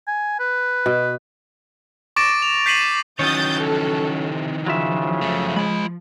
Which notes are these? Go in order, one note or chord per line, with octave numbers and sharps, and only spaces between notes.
G#5
B4
B2
C#6 D6 A6 A#6 D7 E7
F7
G6 B6 C7 D7 D#7 F#7
D#3 E3 F#3 C#4 C#5 D#6 G6 A6
A4
C3
C#3 F3 F#3 F4 E5
F#2 A3
G#3 F4 G#4 B5